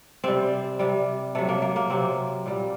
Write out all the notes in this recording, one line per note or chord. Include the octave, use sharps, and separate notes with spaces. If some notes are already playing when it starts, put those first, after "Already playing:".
C3 G3 C4
C3 G3
C3 F#3 A3
A#3
A#3
A#3
C3 F#3 C4
A#2 G3